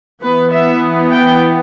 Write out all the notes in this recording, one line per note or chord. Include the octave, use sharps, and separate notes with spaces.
E3 B3 B4
E5
G5